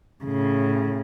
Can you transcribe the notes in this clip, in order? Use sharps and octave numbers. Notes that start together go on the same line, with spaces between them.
A2 C#3